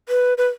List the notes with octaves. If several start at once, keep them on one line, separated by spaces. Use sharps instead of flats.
B4
B4